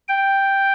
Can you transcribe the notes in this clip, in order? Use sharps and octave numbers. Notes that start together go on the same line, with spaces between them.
G5